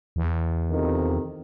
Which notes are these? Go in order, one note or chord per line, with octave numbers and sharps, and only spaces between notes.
E2
F2 C3 D#3